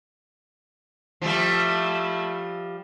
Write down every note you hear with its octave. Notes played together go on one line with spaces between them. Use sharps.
F3 G3 A3 E4